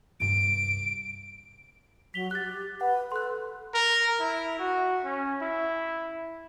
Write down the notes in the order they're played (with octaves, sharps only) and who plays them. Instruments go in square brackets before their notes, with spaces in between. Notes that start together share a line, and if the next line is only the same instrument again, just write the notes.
[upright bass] C2 G2 [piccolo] D7
[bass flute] F#3 [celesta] B6 F7 G7
[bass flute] G4 [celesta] F#6 A6
[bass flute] B4 [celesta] F#5
[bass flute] A4 [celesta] C6 F#6
[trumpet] A#4
E4
F#4
C#4
E4